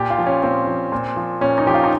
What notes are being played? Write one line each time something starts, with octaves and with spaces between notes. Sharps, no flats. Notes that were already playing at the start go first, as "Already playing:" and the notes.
Already playing: A#2 G4
F4
F3
C#4
A#2 C4
F3
A#2
F3
A#2 C#4
D#4
F3 G4
F4
D#4